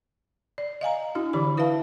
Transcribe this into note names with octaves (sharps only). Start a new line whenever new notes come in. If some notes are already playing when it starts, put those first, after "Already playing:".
D5
D#5 F5 G#5 A#5
D4 E4 F#4
D3 E3 G4 B5
E4 B4 E5 F5 A5